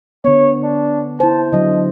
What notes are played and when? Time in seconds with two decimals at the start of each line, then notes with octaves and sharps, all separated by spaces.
0.25 D3 B3 C#5
0.63 D4
1.20 E4 C5 A5
1.53 D3 F#3 D#5